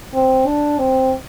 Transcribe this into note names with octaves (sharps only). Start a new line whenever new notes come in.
C4
D4
C4